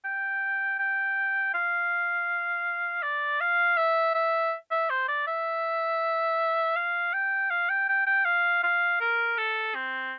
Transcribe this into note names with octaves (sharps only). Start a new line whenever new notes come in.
G5
G5
F5
D5
F5
E5
E5
E5
C5
D5
E5
F5
G5
F5
G5
G5
G5
F5
F5
A#4
A4
C4